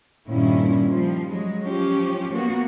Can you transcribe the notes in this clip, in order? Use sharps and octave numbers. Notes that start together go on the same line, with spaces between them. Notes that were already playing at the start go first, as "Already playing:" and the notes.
G2 A#2 D#3 C#4 E4
F3 G3
F#3 G#3
F3 C#4 G4
A#3 B3 F#4